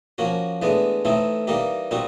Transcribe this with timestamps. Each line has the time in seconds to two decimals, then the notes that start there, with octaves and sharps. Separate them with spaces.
0.18 F3 A#3 C#4 F#4
0.62 A2 E3 G#3 B3 D4
1.05 A2 E3 A3 C4 D#4
1.47 E3 G3 A#3 D#4 G4
1.91 A#2 G3 C4 D#4 F#4